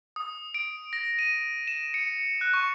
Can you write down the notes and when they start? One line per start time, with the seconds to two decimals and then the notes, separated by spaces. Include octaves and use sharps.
0.16 D#6
0.54 D7
0.93 A#6
1.19 D#7
1.68 E7
1.94 C#7
2.41 F#6
2.54 C#6